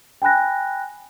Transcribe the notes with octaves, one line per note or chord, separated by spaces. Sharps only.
G5 G#5 B5 F#6 A#6